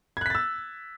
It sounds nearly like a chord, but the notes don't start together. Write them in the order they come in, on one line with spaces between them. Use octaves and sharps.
G#6 F#6 B6 A6 E6